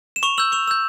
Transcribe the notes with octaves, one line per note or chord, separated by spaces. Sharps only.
E7
C#6 F7
E6 G6 F#7
C#6 F7
E6 G6